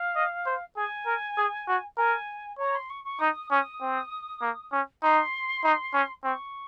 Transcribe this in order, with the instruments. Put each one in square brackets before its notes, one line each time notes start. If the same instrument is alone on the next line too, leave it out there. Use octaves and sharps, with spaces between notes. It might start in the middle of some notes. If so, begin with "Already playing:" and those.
Already playing: [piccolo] F5
[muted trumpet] D#5
C5
[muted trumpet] G#4 [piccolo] G#5
[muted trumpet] A#4
G#4
F#4
[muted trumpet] A#4 [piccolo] G#5
[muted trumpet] C#5 [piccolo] A#5
[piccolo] C6
C#6
C#6
[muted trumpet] D#4 [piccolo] D#6
[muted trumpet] C#4 [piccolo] D#6
[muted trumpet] C4
A#3
C#4
[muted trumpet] D#4 [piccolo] C6
[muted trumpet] D#4
C#4
[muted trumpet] C4 [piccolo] C#6